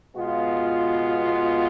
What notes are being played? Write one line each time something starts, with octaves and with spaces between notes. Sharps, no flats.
B2 G#3 B3 F4